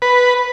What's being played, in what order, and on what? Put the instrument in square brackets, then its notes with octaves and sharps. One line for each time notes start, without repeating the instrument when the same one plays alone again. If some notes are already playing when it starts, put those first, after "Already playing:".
[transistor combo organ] B4